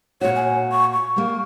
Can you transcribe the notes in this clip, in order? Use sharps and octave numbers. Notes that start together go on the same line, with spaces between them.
A#2 F#4 C#5
G#5
C#6
C#6
G3 A#3